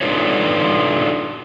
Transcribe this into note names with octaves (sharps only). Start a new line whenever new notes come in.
D4 D#4 F4 A4 B4 C#5